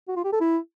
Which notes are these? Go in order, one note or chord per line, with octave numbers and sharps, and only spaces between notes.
F#4
F4
G4
A4
E4